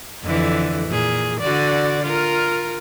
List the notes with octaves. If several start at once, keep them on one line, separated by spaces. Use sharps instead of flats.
F2 D3 E3
A#2 G#4
D3 F#4 D5
F4 A#4